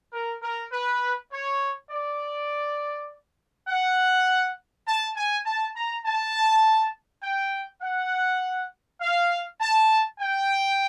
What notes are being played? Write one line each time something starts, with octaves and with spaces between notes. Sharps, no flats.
A#4
A#4
B4
C#5
D5
F#5
A5
G#5
A5
A#5
A5
G5
F#5
F5
A5
G5